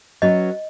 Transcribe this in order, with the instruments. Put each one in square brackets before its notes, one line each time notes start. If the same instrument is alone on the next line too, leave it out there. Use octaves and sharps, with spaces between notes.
[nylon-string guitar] F#3 C#4 F#4 B4 [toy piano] D#5